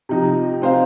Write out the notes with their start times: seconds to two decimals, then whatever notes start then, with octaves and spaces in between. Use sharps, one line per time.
0.09 C3 F3 D#4
0.61 C4 D#4 C5 F5